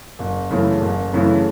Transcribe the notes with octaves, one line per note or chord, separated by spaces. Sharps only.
F#1
F#2 C#3 E3 A3
F#1
F#2 C#3 E3 A3